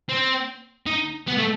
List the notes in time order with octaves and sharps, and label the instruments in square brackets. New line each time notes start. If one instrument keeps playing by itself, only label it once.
[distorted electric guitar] C4
D#4
B3
A3